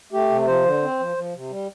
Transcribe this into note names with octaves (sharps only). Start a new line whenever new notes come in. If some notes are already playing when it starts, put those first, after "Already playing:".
A3 G4
C3
F3 C5
D3
C4
F3
F3
C3
G3